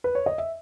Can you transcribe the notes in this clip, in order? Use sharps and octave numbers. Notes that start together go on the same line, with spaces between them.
B4
C#5
D#5
E5